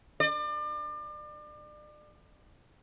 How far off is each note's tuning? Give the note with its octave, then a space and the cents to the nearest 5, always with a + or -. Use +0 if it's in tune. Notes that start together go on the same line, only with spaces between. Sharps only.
D5 +35